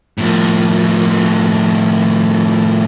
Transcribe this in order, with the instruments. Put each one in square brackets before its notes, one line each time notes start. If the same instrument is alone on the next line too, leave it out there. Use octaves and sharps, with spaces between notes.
[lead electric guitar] A2 F3